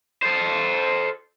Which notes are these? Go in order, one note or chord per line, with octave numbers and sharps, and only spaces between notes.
A4 C5